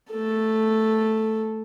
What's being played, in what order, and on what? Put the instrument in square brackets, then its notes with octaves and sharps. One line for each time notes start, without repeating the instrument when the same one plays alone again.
[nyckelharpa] A3 A4